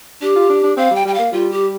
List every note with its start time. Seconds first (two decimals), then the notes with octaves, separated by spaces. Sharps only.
0.21 D4 G4
0.36 F4
0.50 D4
0.64 D4
0.77 C4 F5
0.91 G3 G5
1.05 G3 G5
1.14 A#3 F5
1.32 G3 F4
1.51 G4